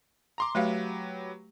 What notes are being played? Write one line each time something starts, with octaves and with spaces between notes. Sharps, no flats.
A#5 C6 D6
F#3 A3 G4 B4 F5